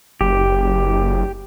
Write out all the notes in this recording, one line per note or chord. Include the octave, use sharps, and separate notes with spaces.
F#1 G4